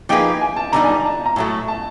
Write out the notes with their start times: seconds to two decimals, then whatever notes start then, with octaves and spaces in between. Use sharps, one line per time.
0.09 F3 A#3 D#4 G#4 B4 G5
0.41 G#5
0.56 A5
0.72 D3 G3 B3 D#4 A#5
0.84 G#5
0.89 A5
1.05 A5
1.26 A#5
1.36 A2 F#3 A3 A5
1.68 A5